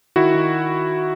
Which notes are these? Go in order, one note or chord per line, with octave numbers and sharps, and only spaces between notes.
D#3 E4 F#4
D#3